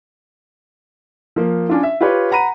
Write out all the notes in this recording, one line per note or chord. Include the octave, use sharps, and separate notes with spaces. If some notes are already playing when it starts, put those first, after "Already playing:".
F3 A#3
C#4 D4 F4
E5
F4 G4 B4 C#5
F#5 A#5 B5 D#7